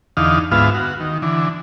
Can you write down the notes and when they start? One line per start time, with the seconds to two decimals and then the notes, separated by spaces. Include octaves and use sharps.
0.17 E2 D3 D#4 F5
0.51 D2 G#2 B3 F4 E5 F5
0.75 F#4
1.00 D#3
1.22 D3 E3